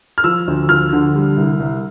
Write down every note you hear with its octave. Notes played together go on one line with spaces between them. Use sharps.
F6
F3 E6
D2
F3 F6
D3
G3
C2
C2